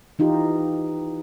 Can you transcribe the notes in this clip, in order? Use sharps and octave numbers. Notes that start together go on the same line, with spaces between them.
E3 D#4 F4 G4